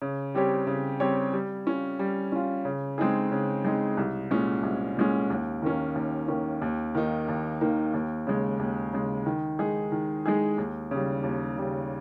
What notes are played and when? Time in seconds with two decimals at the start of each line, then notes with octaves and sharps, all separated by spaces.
0.02 C#3
0.35 G3 C4 G4 C#5
0.67 C#3
1.00 G3 C4 G4 C#5
1.33 G3
1.67 C#4 F4
1.99 G3
2.32 C#4 F4
2.65 C#3
2.98 G#3 C4 D#4 G#4
3.32 C#3
3.65 G#3 C4 D#4 G#4
3.97 C2
4.31 A#2 G#3 C#4
4.63 C2
4.97 A#2 G#3 C#4
5.30 D#2
5.62 D#3 A#3 C#4
5.95 D#2
6.28 D#3 A#3 C#4
6.62 D#2
6.95 D#3 A#3 D#4
7.28 D#2
7.61 D#3 A#3 D#4
7.94 D#2
8.27 C#3 G#3
8.59 D#2
8.93 C#3 G#3
9.26 D#3
9.59 G#3 D#4 G#4
9.92 D#3
10.26 G#3 D#4 G#4
10.58 D#2
10.91 C#3 G3
11.23 D#2
11.58 C#3 G3